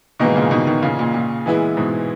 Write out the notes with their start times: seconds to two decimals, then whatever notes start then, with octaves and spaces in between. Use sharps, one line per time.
0.19 G#2 B2 D#3 E3 A#3 D#4
0.36 A#2 C#3
0.51 B2 D#3
0.67 B2 D#3
0.83 A#2 C#3
0.99 A#2
1.14 A#2
1.46 E3 G#3 B3 E4
1.77 G#2 B2